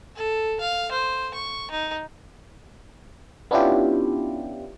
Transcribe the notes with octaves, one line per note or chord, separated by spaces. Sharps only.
A4
F5
C5
C#6
D#4
B3 C#4 D4 E4 F4 G4